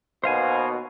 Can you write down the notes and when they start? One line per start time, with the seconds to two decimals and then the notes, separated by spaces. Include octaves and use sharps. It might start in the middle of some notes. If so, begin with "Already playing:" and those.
0.24 D#2 B2 C5 F5 G#5